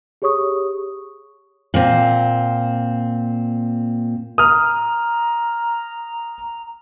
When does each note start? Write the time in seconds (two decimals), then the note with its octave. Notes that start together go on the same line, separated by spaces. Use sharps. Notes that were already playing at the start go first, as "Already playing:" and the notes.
0.22 G4 G#4 C#5 C#6 D#6
1.74 A#2 C4
4.38 A#5 D#6 F6